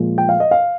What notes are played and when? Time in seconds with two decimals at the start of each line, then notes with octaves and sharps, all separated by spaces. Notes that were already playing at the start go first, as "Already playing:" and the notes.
Already playing: A#2 F3 G#3
0.18 G5
0.29 F5
0.40 D#5
0.51 F5